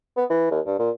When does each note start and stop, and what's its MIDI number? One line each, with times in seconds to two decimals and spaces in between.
0.17 0.25 59
0.30 0.49 52
0.51 0.60 39
0.66 0.75 43
0.79 0.90 46